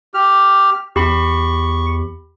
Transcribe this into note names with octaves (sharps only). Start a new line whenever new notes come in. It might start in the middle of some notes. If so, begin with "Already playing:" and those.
G4 F6
E2 G4 B5 C#6